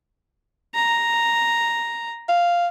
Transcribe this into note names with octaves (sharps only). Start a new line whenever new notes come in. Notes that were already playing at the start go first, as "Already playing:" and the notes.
A#5
F5